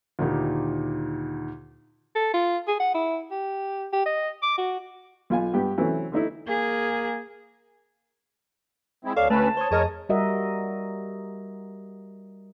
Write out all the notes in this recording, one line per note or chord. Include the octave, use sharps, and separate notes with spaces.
D2 A#2 D#3 D#4 G4
A4
F4
G#4
F#5
E4
G4
G4
D#5
D6
F#4
B1 F4 G#5
G2 B3 G4 G5
C3 E3 F#3 A3 C4 C#4
D3 A3 D#4 E4
A#3 G#4
G#3 C4 E4
D2 A4 C#5 D5 F5
D2 A3 C#4 B4 A5
C5 C#5 D#6
F2 G#4 A#4 C#5 D#5
G3 F#4 A#4 D#5 E5 F#5